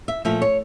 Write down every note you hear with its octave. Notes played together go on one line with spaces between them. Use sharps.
E5
A#2 F3 A3 E5
C#5